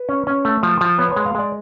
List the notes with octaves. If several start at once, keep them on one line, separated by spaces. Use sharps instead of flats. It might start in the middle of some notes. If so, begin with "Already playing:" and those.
Already playing: B4
C#4
C#4
A3
F3
F3
B3 C#5
G#3 C#5
F5
G#3 D5